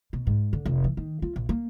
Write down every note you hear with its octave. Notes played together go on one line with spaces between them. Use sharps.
B2
G#2
D3
F1
E3
D#3
F4
A#1
A#3